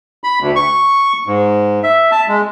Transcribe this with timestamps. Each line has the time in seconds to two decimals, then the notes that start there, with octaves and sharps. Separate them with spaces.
0.24 B5
0.40 D2
0.56 C#6
1.27 G#2
1.83 E5
2.12 A5
2.28 G#3